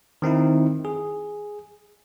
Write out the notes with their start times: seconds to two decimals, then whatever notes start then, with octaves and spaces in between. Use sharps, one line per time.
0.22 D#3 C4 D#4 E4
0.85 G#4